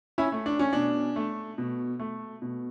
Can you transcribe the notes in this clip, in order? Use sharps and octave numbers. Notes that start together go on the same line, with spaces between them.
C#4 E4
A3
D4
C#4
B2 D4
A3
B2
A3
B2